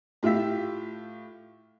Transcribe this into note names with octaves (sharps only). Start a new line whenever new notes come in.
A2 F4 G4 E5 E6 B6